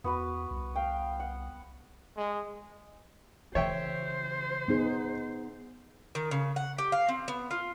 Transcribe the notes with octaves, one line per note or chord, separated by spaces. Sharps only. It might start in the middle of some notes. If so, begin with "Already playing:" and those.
E2 B3 F#4 B4
C2
F5 G5
F#5
G#3
C#3 E3 C5 C#5 E5 G5
B3 D#4 G#4
D#3
C#3
F#5
G4
F5
C4
B3
F4